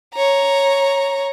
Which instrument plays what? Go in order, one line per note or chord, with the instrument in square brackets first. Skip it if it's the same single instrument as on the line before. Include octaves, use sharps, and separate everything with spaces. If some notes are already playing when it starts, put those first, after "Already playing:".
[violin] C#5 A#5